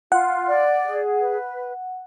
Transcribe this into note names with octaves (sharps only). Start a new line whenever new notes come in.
F4 F#5
D5
G#4
B4